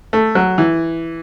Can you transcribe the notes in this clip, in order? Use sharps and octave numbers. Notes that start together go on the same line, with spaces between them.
A3
F#3
E3